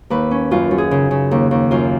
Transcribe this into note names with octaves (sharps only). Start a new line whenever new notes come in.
D#2 B4
C#4
F#2 F4
F#2
G#4
C#3
C#3
D#2
D#2
F#2 F4